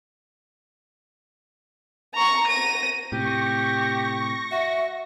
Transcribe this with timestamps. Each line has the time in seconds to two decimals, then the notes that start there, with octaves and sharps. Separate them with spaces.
2.14 A#5 C#6
2.48 A#6 D#7
3.12 A2 C3 G4 C#6 A#6
4.51 F#4 E5